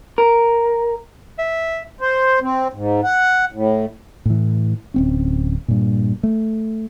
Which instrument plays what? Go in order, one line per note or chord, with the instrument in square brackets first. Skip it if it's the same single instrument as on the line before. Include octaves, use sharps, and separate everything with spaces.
[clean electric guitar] A#4
[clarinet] E5
[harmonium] C5
C4
G#2
F#5
A2
[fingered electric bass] A2 E3
D1 C4 C#4
G2 A#2
A3